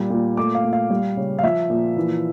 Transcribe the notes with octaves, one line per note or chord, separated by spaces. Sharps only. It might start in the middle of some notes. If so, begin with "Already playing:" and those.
Already playing: A#2 G3
A#2
A3 D6
F5
A#2
F5
G3
C#3
F5
F3 E5
A#2
E3